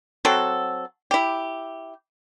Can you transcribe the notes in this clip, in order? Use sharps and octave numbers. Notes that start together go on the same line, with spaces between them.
F#3 C4 F#4 A4
E4 G4